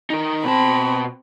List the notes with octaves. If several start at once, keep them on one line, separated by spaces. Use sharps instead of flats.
D#4 A#4
B2 C4 A5 B5